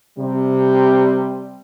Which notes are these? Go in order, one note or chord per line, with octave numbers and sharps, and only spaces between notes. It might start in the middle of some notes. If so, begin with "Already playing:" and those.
C3 G3